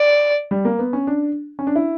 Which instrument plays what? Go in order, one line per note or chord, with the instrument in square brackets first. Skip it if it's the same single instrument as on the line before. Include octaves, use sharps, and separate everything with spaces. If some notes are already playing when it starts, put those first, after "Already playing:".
Already playing: [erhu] D5
[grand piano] G3
A#3
B3
C#4
D4
C#4
D4
E4